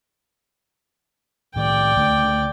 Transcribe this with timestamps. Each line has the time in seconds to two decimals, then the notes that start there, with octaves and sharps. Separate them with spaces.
1.56 A2 D#3 D5 G5
1.96 C#2 D3 A3